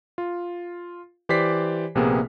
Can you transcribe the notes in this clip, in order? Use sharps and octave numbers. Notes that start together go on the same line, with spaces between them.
F4
E3 G4 C5 D5 B6 C7
A#1 C3 A#3 B3 G#4